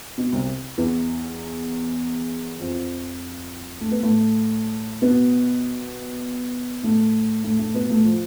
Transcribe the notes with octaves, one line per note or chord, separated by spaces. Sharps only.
B2
C2 C3
E2 E3
F2 F3
A3
B3
A2 A3
B2 B3
A2 A3
A2 A3
A2 A3
B2 B3
A2 A3
F3